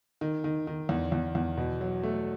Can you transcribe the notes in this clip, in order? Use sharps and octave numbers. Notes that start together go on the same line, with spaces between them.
D#3
D#3
D#3
E2
E2
E2
B2
F#3
A3